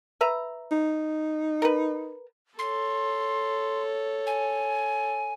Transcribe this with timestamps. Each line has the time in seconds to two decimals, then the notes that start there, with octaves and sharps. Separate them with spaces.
0.21 B4 E5 A#5
0.72 D#4
1.62 A#4 B4
2.59 A4 C#5 C6
4.27 G#5